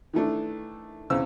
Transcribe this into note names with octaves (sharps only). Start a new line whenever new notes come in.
D#3 E3 A3 D4
E2 C#3 C4 E6